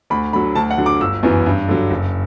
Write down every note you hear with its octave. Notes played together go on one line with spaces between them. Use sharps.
D2 B5
D3 F#3 B5
D2 A5
F#5
D3 F#3
D6
G1 E6
F#2 E3 B3
G2
D3 F#3
F#1